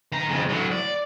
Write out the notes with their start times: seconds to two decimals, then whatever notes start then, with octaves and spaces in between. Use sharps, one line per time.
0.12 D#3 A#5
0.29 F2 C#3
0.49 A2 F#3
0.72 D5